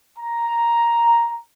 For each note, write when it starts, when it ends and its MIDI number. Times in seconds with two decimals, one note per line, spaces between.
0.18 1.41 82